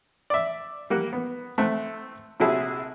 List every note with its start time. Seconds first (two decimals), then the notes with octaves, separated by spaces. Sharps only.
0.30 D5 E5
0.90 G3 A#3 F#5
1.13 B3
1.58 A3 C4 E5 F#5
2.40 A#1 C3 F#3 E4 G#4 A5